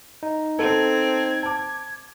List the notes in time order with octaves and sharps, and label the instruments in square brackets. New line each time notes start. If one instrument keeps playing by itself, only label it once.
[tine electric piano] D#4
[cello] C4 [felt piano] A4 [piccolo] G#6
[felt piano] A5 D6